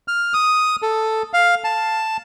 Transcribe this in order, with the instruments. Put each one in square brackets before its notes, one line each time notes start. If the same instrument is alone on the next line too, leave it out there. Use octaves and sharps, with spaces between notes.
[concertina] F6
D#6
A4
F5
A5